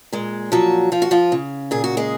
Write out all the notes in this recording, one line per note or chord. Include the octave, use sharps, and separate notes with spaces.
A#2 G#3
F3 F#3 F#4
F3 F4
F#4
F3 F4
C#3
A#2 G#4
F#4
G#3 G#4